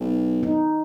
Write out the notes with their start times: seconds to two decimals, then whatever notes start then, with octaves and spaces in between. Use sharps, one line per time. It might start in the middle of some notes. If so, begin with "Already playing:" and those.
0.01 B1
0.43 D#4